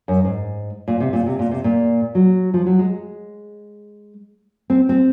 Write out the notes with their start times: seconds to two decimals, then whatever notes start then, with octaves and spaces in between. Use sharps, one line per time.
0.08 F#2
0.25 G#2
0.88 A#2
1.00 C3
1.13 A#2
1.26 C3
1.39 A#2
1.51 C3
1.64 A#2
2.15 F#3
2.54 F3
2.66 F#3
2.79 G#3
4.70 C4
4.89 C4